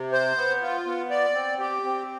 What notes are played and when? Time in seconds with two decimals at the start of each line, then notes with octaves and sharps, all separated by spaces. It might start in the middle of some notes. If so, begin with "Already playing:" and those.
Already playing: C3
0.12 C5
0.37 B3
0.62 F4
0.86 B3
1.11 D5
1.34 C4
1.59 G4
1.84 C4